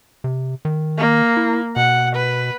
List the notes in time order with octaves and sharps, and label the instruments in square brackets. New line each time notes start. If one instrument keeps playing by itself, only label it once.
[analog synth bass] C3
D#3
[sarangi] A#3
[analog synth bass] E4
[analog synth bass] B2 [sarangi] F#5
[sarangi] B4